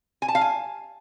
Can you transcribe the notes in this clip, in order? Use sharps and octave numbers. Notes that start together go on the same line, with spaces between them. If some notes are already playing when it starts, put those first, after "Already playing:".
G#5
A5
F5
G#5